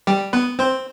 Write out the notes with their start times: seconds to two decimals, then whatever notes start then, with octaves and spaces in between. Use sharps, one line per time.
0.07 G3 G4
0.33 B3 B4
0.59 C4 C5